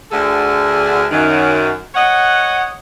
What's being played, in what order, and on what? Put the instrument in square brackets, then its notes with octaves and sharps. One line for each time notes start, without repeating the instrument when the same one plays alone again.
[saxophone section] D2 D3 G#4 A4
F#2 D#3
C#5 D#5 F#5